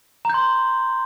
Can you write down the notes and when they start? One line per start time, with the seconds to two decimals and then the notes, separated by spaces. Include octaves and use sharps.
0.25 A#5
0.30 G6
0.34 C6